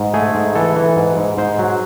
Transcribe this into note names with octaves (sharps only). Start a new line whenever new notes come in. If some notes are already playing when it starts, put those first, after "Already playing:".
Already playing: G#2
A3 G#4
G#2
E3 A4
E3
G#2
G#2
G#2 C5
F#3